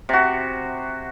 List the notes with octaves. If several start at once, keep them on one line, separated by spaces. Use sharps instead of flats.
C3 F#4